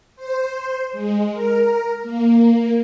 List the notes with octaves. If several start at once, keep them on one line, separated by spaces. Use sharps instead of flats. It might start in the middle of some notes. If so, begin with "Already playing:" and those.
C5
G#3
A#4
A#3